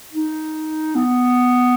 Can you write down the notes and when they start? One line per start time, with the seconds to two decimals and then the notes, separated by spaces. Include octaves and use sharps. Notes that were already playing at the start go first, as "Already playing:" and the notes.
0.13 D#4
0.95 B3